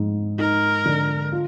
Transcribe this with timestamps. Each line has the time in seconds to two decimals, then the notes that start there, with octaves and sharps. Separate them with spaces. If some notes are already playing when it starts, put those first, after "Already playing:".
Already playing: G#2
0.39 D#4 A#4
0.85 D3
1.32 F4